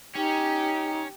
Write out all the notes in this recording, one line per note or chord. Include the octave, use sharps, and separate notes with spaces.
C#4 D#4 G4